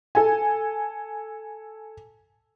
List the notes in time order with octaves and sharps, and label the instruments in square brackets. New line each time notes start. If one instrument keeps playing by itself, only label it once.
[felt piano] A4 G#5